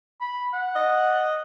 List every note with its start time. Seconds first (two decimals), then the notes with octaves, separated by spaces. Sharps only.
0.21 B5
0.53 F#5
0.76 D#5